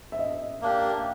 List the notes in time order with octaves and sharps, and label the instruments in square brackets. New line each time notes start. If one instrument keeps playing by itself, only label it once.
[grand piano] E5
D#5
[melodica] A#3 D4 G4